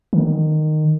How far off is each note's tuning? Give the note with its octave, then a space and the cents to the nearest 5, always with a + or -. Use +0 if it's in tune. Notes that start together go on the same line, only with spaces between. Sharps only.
D#3 -15